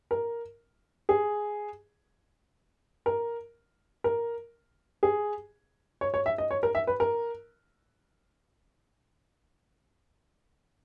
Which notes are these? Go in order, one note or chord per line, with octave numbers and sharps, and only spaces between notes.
A#4
G#4
A#4
A#4
G#4
C#5
C#5
E5
D#5
C#5
A#4
E5
B4
A#4